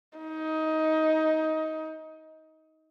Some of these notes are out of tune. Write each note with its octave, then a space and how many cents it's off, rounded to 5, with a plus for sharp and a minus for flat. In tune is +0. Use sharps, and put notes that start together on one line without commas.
D#4 +20